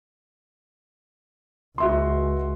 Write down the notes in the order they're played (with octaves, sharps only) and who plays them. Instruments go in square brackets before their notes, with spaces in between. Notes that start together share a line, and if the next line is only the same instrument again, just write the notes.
[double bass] C#2 [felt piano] F#4 E5 C6